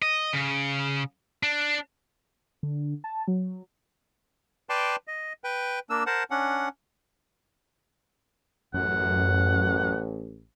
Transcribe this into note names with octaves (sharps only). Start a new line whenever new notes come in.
D#5
C#3
D4
D3
A5
F#3
B4 D5 G5 A5 C6
D#5
B4 G5
A#3 D4 E6
A#4 C5 F#5 A5
C#4 D4 F#5
A1 F#2 F#5